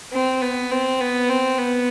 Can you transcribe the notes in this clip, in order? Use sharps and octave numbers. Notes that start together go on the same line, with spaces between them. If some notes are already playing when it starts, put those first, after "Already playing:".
C4
B3
C4
B3
C4
B3